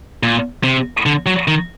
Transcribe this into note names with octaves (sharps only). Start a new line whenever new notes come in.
A#2
C3
D3
F#3
D#3